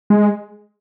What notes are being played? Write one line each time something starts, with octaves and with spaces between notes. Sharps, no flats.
G#3